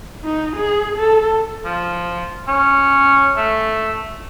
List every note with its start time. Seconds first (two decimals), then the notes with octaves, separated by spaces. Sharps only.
0.25 D#4
0.57 G#4
0.96 A4
1.65 F3
2.48 C#4
3.37 A3